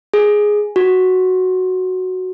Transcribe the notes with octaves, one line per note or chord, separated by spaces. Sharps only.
G#4
F#4